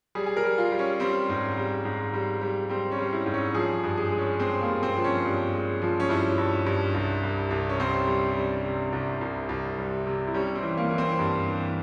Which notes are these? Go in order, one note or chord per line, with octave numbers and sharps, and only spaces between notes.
G3 G#4
G#4
A#4
G3
F4
G3
C#4
G3 C4
G#2
G3
G#2
G3
G3
G3 C4
C#4
G3
E4
G#2
C#4
F3 G#4
G2
G#4
G#3
C#4
G#3 C4
A#3
G2
C4
F3
C#4
G2
G#3
F3
C#4
G2 E4
G2
G2
C2
C2
C2
C#4
C2 C4
G3
G3
C3
C2
C2
C2
G3
C3
E4
G3 C#4
C4
E3
A#3
E3
C4
G2
E3